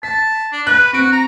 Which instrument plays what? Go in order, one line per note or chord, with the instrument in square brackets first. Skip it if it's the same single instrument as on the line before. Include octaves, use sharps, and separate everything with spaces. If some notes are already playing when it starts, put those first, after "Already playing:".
[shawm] A5 [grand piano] B6
[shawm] D4
[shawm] B4 [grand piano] F#6
[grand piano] C4 D7 [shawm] F#4
[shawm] A#5